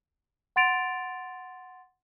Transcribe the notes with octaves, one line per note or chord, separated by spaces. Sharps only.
F#5 C6 A6 D7 F7